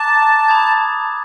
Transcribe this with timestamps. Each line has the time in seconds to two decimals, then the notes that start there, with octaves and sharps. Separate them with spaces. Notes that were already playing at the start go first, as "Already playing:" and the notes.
Already playing: A5 A#5 D6 F#6 A6
0.48 B5 D#6 G#6